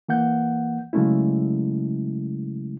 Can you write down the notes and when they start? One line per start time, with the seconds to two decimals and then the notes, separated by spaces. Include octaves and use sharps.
0.09 E3 A#3 F#5 G6
0.93 C#3 F#3 G#3 A3 C#4 E4